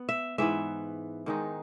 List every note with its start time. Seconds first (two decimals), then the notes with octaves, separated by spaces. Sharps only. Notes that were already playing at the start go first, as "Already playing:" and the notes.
Already playing: B3
0.09 E5
0.38 G#2 E3 B3 E5
1.26 G#2 D#3 G#3 D#4